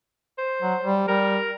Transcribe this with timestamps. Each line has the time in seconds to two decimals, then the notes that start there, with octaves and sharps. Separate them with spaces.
0.38 C5
0.62 F#3
0.80 G3
1.08 G3 A#4